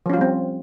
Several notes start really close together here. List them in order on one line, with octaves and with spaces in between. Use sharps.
F3 C#4 F4 G3 C4